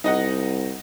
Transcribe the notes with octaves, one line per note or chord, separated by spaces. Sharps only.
C2 D#4 D#5 F#5